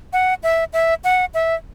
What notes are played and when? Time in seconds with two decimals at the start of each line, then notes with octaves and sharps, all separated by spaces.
0.13 F#5
0.43 E5
0.73 E5
1.04 F#5
1.34 E5